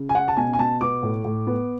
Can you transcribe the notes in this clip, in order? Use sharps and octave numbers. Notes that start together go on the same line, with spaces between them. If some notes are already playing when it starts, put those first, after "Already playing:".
Already playing: C#3
G#5
C#4 F#5
A5
B2 G#5
G#5
B2 A5
B3 D6
A2
A2
B3